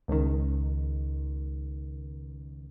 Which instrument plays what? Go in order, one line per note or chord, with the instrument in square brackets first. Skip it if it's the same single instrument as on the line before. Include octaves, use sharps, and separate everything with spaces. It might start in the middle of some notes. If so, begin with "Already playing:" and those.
[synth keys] C#2 D#3